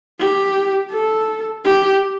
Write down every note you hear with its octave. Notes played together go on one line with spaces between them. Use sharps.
G4
A4
G4